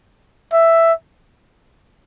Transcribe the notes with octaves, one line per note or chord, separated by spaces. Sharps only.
E5